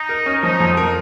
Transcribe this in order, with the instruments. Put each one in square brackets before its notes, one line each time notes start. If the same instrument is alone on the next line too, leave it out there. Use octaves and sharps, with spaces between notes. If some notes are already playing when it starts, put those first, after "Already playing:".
Already playing: [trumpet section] D#4
[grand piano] A#4
C#4
[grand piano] F3 [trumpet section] D#4
[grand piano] F2
A#4